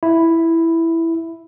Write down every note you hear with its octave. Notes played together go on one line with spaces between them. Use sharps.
E4